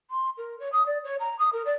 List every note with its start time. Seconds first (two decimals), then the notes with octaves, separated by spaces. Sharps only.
0.10 C6
0.38 A#4
0.60 C#5
0.72 D#6
0.86 D5
1.04 C#5
1.20 A#5
1.39 D#6
1.53 A#4
1.65 D5